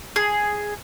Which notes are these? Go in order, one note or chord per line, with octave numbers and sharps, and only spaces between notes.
G#4